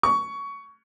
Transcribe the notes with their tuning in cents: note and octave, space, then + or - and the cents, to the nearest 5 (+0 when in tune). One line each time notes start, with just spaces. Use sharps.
C#6 +15